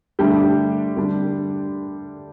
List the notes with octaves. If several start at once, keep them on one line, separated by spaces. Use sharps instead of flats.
D3 G3 A3 D4 G4
D3 G3 D4